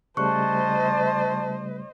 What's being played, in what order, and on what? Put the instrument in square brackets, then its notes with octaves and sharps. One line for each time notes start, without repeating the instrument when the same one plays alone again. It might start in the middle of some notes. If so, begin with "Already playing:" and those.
[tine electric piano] C#3 G3 A3 [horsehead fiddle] C5 D#5 [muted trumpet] A5 [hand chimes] C#6 F#6